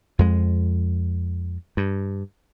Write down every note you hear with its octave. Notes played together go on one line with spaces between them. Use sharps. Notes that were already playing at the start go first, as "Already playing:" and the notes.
F2 G#3
G2